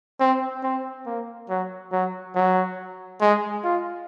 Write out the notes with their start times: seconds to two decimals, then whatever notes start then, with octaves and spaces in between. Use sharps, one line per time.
0.20 C4
0.63 C4
1.06 A#3
1.49 F#3
1.92 F#3
2.35 F#3
3.21 G#3
3.64 F4